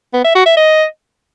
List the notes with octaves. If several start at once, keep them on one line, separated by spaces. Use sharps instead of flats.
B3
E5
F#4
E5
D#5